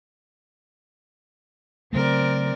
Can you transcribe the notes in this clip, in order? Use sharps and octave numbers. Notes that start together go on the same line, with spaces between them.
C#3 F#3 A3 C4 A#4 D5